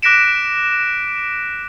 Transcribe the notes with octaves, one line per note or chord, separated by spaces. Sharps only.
D6 F#6 A#6 B6 D7 E7